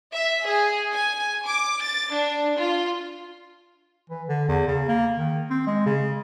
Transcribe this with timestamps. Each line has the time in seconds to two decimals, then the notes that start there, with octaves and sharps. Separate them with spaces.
0.13 E5
0.46 G#4
0.93 G#5
1.45 D6
1.82 A6
2.13 D4
2.58 F4
4.10 E3
4.29 D3
4.48 E2
4.67 C#3
4.88 A#3
5.16 D#3
5.50 C4
5.67 G#3
5.86 C#3